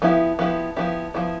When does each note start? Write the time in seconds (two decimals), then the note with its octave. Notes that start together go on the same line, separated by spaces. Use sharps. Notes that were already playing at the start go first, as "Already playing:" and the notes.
0.02 F3 B3 E4 G4
0.39 F3 B3 E4 G4
0.76 F3 B3 E4 G4
1.14 F3 B3 E4 G4